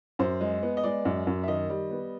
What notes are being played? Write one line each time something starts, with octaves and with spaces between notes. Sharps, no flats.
F#2 C5
G#3
B3
D#5
G#3 D5
F#2
F#2
E5
D#3 D#5
G3
B3